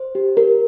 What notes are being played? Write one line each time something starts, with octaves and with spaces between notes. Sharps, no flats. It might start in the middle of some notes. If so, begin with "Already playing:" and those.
Already playing: C5
G4
A#4